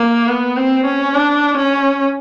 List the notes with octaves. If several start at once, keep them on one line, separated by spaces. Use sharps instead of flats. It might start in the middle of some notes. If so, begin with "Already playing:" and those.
Already playing: A#3
B3
C4
C#4
D4
C#4